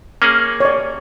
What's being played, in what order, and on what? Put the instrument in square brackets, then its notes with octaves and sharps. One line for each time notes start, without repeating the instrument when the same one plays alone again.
[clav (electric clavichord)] A#3 C#4 G#4
[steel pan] C#5 D5